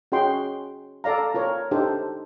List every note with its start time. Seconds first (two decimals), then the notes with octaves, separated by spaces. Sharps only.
0.12 C#4 F#4 G#4 D#5 G5 C6
1.04 A4 D5 F5 A#5
1.34 F4 A#4 C#5
1.71 D4 D#4 G4 A4 C5